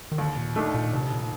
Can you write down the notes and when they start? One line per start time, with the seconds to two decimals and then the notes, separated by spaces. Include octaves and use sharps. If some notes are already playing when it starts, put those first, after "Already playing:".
0.12 D#3
0.18 D#2 D3
0.37 A#2
0.56 D#3 A3 D4
0.74 A#2
0.92 F1 C3
1.12 A#2